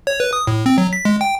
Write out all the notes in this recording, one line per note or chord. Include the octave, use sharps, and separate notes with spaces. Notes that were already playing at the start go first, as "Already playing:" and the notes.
C#5
B4
D#6
A2
C4
F#3
B6
G#3
G5